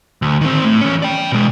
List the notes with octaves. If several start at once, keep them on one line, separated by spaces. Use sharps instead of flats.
D2
D#3 C4
A2
E2 C#4
D5 G5
B2 G#3